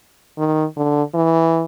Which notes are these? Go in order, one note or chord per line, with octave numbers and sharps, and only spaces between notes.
D#3
D3
E3